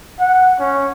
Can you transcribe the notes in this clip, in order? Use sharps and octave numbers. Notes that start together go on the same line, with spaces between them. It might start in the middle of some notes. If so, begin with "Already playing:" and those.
F#5
C#4